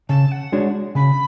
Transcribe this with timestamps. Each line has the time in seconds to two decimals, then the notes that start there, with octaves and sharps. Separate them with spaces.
0.09 C#3 A5
0.31 F#5
0.52 G#3 D4 F#4 C#5
0.95 C#3 B5